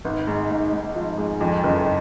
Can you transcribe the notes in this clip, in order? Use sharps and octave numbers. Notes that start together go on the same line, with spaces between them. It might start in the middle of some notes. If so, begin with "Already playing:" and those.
G#1
G#2
G#2
G#2
F3
G#3
F2
F#1